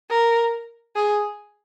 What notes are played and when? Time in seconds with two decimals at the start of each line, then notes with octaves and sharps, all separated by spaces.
0.10 A#4
0.96 G#4